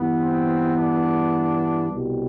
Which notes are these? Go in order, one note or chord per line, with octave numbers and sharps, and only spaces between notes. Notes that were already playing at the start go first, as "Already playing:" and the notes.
Already playing: G2 E3 B3
C4
D4
C2 B2 G3